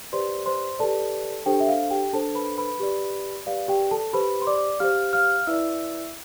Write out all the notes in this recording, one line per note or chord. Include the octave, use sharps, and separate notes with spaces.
G4 B4 C5 D5 C6
C5 C6
G4 A4 B4 D5 A5
D4 G4 A4 C5 G5
E5
F5
G4 G5
D4 A4 C5 A5
B4 B5
B4 B5
G4 B4 D5
G4 B4 D5 F5
G4 G5
A4 A5
G4 B4 C5 B5
C6
D5 D6
G4 C5 F5 F6
F5 F6
E4 B4 D5 E5 E6